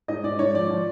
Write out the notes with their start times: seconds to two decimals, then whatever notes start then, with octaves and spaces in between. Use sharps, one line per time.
0.08 G#2 D#5
0.24 G#2 D5
0.39 G#2 C#5
0.54 F3 D5
0.70 F3